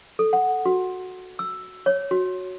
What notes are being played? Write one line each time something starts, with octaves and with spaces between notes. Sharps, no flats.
A4
F#5
F#4
E6
C#5
F#4